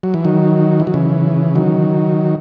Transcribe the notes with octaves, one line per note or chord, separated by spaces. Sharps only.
F#3
E3
D#3 F#3
E3
F#3
C#3 E3
D#3 F#3